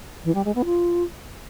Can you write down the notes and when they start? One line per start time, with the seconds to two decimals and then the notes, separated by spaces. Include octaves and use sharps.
0.24 E3
0.35 G3
0.45 G#3
0.55 B3
0.65 F4